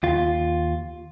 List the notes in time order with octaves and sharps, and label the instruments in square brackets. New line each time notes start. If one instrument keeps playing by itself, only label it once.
[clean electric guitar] D#2 F4